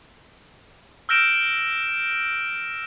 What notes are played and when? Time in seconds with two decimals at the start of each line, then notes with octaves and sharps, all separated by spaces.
1.09 E6 F6 G6 A#6 D7 E7